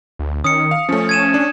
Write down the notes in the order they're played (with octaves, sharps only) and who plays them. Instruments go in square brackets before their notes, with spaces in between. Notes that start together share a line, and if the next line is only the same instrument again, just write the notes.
[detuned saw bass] D2
[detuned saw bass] D#3 [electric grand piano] C#4 [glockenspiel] D#6 C#7
[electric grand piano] F5
[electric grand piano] F3 A3 [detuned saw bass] C#4
[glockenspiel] G#6 D#7 E7
[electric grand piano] D4